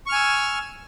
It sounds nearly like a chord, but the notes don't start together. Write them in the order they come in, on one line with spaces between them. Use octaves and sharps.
C#6 F6 G#5 E6